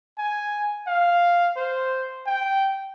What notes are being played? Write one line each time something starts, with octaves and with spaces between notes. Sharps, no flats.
G#5
F5
C5
G5